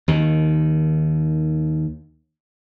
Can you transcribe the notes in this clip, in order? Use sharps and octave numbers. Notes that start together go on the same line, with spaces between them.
D#2 D#3